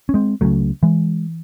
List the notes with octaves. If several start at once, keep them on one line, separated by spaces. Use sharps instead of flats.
C#4
G#3 C4
C#2 C#3 F#3 A3
E3 G#3